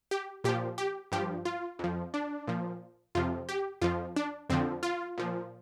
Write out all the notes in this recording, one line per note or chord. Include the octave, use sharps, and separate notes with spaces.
G4
A#2 F3 G4
G4
G2 F3 G4
F4
F2 F3
D4
A#2 F3
F2 C3 F3 F4
G4
F2 F3 F4
D4
F2 D3 F3 C4
F4
A#2 F3